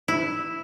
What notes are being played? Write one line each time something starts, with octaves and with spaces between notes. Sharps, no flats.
E4